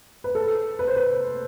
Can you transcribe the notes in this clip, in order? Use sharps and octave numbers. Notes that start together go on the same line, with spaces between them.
B4
A4
B4
C5
B4